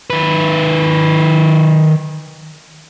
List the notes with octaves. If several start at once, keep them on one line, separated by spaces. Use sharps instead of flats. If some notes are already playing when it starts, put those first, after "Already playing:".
D#3 B4